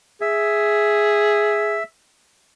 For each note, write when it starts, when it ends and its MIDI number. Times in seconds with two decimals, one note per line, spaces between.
0.21 1.79 68
0.21 1.83 76